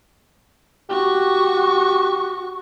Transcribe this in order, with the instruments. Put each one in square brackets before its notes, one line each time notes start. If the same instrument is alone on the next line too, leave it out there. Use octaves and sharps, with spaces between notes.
[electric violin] F#4 C#6 [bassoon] G4